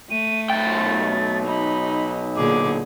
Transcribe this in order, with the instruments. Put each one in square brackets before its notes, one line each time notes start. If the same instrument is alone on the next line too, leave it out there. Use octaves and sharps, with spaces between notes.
[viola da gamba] A3 [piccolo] D#7
[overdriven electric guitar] B1 G5 [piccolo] A6
[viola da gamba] D#4 [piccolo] B5
[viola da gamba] A#2 D3 G#4 [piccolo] D6